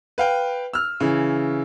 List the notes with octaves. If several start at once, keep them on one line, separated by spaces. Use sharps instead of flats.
B4 F5 G5
E6 F6
C#3 E3